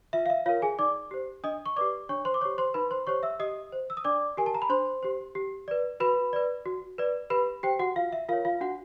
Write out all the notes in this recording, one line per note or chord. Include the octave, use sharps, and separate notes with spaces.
F4 E5
F5
E5
F4 A#4 C#5 F5
G#4 G#5
D#4 D5 D6
G4 C5
D4 D#5 D#6
C#6
G4 B4 D5 D6
D4 C#5 C#6
C5 C6
D6
G4 C5 C#5 C#6
C5 C6
D#4 B4 B5
C5 C6
G4 C5 C#5 C#6
E5 E6
G4 D#5 D#6
C5
E6
D#6
D4 D5 D6
G4 A#4 G#5
A5
A#5
B5
D4 C5 C6
G4 C5
G4
B4 D5
F#4 B4 B5
B4 D5
F#4
B4 D5
G4 B4 B5
G4 C5 G5
F#4 F#5
F4 F5
E5
F4 A#4 C#5 F5
F4 F5
D4 F#4 F#5